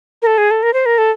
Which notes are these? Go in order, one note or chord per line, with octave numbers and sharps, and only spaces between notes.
A#4
A4
G#4
A4
A#4
C5
A#4
A4